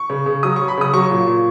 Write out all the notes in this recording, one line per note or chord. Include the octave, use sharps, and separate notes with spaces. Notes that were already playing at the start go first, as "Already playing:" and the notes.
Already playing: C#6
C#3
C#3
F#3 D#6
F#3 C#6
B5
C#3 D#6
F#3 C#6
A#2
A#2